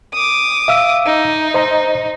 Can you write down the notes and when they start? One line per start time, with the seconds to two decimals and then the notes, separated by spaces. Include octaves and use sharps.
0.14 D6 D#6
0.68 E5 F5 E6
1.06 D#4
1.54 C5 D#5 A#5